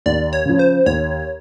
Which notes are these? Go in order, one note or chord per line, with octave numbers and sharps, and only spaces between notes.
D#2 D5
C#5
C#3 F3
C5
D#2 C#5